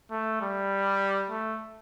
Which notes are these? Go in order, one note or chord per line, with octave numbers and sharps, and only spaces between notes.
A3
G3
A3